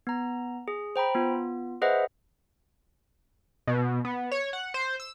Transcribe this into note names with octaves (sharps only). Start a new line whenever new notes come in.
B3 A#5
G#4
C5 G5 A#5 B5
B3 F4
G#4 B4 C5 D#5 E5 F#5
B2
B3
C#5
F#5
C5
E6